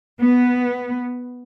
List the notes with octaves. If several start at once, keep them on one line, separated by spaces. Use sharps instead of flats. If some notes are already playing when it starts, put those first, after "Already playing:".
B3